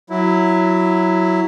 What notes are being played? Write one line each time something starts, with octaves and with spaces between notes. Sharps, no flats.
F#3 E4